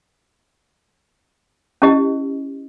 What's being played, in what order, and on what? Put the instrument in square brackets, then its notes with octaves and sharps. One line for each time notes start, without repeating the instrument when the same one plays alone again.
[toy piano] C#4 E4 G4 D#5